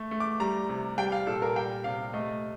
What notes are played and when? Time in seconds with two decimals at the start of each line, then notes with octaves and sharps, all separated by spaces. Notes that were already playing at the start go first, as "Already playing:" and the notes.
Already playing: A3
0.11 A3
0.20 D6
0.40 G3 A#5
0.69 C3
0.98 G3 G5
1.12 F5
1.27 A#2 A4
1.42 A#4
1.56 G3 G5
1.84 C3 F5
2.13 A3 D#5